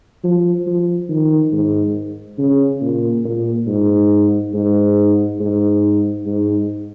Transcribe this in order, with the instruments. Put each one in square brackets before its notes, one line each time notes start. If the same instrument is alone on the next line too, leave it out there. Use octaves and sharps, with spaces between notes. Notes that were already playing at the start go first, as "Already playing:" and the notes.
[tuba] F3
F3
D#3
G#2
C#3
A#2
A#2
G#2
G#2
G#2
G#2